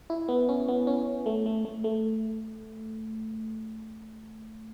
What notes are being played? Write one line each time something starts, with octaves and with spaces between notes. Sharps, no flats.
E4
B3
C#4
B3
C#4
A3
A3
A3
A3